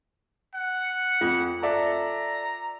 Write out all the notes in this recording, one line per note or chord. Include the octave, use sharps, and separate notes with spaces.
F#5
F2 F4
A4 D5 E5 A#5